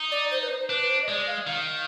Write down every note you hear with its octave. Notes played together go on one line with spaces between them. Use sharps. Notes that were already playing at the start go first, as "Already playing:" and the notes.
Already playing: D#4
D5
C5
B4
C5
C5
D4 B4
C5
D#5
G#3 D5
F5
D#3 F5